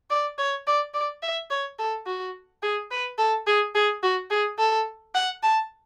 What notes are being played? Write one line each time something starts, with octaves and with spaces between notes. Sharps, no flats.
D5
C#5
D5
D5
E5
C#5
A4
F#4
G#4
B4
A4
G#4
G#4
F#4
G#4
A4
F#5
A5